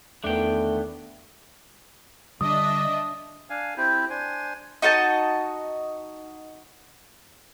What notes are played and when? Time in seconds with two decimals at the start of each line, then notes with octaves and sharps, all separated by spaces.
0.24 E2 D#3 A3 B3 D4 G5
2.41 D3 G3 D4 D#5 E5 D#6
3.50 D4 F5 G#5
3.77 C4 E4 G4
4.10 D4 C5 G#5
4.82 D#4 F#4 D#5 A5